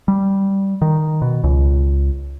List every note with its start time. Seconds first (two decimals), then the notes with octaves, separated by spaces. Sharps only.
0.08 G3
0.82 D#3
1.22 B2
1.44 C#2